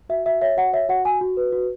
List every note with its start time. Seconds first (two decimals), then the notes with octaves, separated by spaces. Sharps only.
0.09 F#4 E5
0.26 F#4 E5
0.42 C#5 E5
0.57 F#4 F#5
0.73 C#5 E5
0.89 F#4 F#5
1.05 F#4 G#5
1.21 F#4
1.37 B4
1.52 F#4